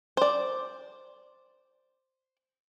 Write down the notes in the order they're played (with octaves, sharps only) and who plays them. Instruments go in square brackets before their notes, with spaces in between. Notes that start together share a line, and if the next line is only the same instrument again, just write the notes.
[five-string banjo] C5 D5